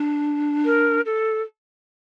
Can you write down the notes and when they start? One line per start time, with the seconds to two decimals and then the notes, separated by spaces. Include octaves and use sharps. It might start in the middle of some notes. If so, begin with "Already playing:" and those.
Already playing: D4
0.65 A#4
1.06 A4